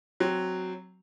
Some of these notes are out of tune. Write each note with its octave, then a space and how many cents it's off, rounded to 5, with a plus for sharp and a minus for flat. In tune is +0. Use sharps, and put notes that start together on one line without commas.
F#3 +5 C4 +0